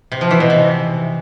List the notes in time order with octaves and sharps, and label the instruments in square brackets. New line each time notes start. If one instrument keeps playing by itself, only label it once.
[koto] C3
F3
E3
B2
C3